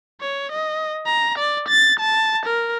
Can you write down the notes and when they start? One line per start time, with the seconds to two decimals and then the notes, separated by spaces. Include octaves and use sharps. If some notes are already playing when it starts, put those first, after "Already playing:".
0.21 C#5
0.52 D#5
1.06 A#5
1.39 D5
1.69 A6
2.01 A5
2.46 A#4